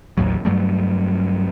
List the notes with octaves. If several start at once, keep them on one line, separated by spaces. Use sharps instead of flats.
A1 D#2 A2 F#3
G2 F#3 G3 A3